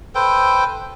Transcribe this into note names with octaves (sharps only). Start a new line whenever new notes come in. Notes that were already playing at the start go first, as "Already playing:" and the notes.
A4 B4 C5 G5